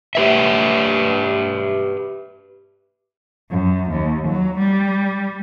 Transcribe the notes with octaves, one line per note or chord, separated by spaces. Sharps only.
G4 B4 E5
F#2
D#2
F#3
G3